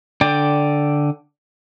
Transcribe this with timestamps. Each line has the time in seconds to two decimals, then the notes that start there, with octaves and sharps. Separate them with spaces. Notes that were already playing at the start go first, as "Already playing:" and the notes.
0.21 D3 D5 G5